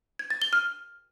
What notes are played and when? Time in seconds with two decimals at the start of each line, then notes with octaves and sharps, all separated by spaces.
0.19 G#6
0.30 A6
0.42 G7
0.53 F6